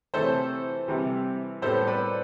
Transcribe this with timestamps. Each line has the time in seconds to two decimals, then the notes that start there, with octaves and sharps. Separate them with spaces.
0.14 C3 E3 A3 A4 C5
0.88 C3 E3 G3
1.62 A2 G3 B3 A4 C5
1.87 B4 D5